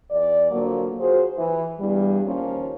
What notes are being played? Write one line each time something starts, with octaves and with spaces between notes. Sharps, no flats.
E2 D5
D3 F3 F#3 A#3
F4 F#4 G#4 C5
E3
E2 G2 G3
D#2 F3 A#3 C#4 F4